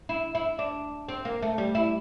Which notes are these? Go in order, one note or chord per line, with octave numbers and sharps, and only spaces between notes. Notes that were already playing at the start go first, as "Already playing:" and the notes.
E4
E4
D4
C4
A#3
A3
G3
E4